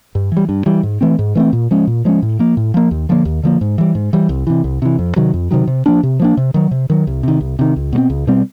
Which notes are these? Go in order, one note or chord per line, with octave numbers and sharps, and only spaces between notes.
G2
E3 G3
G2
E3 G3
G#2
E3 A3 C4
G#2
E3 A3 C4
A#2
F3 G#3 C#4
A#2
F3 G#3 C#4
A2
F3 A#3
A2
F3 A#3
D#2
D3 F3 A#3
D#2
D3 F3 A#3
G#2
E3 G3
G#2
E3 G3
C2
C3 E3
C2
C3 E3
F2
C3 D#3 F#3
F2
C3 D#3 F#3
C3
F3 A#3 D4
C3
F3 A#3 D4
C3
D#3 F#3
C3
D#3 F#3
C2
C3 D#3
C2
C3 D#3
C#2
B2 G3 C4
C#2
B2 G3 C4